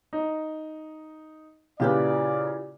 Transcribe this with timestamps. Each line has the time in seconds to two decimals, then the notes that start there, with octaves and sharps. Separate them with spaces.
0.13 D#4
1.80 A#2 C#3 E4 F4 G4 B4 D5